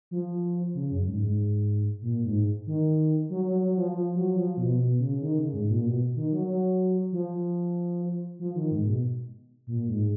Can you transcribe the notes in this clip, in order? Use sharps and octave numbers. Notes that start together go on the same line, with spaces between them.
F3
C#3
F#2
G#2
G#2
A#2
G#2
D#3
F#3
F#3
F#3
F3
F3
F#3
F3
B2
B2
C#3
D#3
C#3
G#2
A#2
B2
D#3
F#3
F#3
F3
F3
D#3
G#2
B2
A#2
G#2